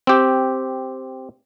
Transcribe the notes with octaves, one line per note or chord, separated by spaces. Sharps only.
C4 G4